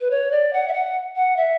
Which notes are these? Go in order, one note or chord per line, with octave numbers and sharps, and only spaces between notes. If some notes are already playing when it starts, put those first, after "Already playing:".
B4
C#5
D5
F#5
E5
F#5
F#5
E5